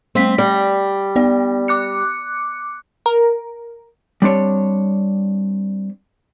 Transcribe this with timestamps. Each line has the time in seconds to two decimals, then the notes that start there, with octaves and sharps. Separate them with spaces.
0.15 G3 A3 C4 B6
0.38 G3 D5
1.16 B3 D5
1.68 D6 F#6 C#7
3.06 A#4
4.22 G3 C4 D4 C#5